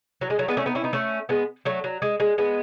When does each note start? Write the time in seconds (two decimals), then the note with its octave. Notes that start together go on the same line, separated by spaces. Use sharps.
0.21 F#3
0.30 G#3
0.39 F#3 A3
0.48 G#3 B3
0.57 A3 C#4
0.66 B3 D#4
0.75 C#4 E4
0.84 B3 D#4
0.93 A3 C#4
1.29 G#3 B3
1.65 F#3 A3
1.84 F#3
2.02 G#3
2.20 G#3
2.38 G#3 B3